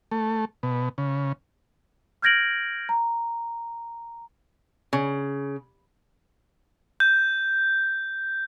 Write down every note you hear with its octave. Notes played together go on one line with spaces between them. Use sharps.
A3
B2
C#3
F6 G6 G#6 A#6 D7 F#7
A#5
C#3
G6